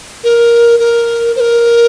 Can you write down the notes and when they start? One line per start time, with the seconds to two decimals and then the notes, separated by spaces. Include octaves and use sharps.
0.24 A#4
0.79 A#4
1.36 C5
1.40 A#4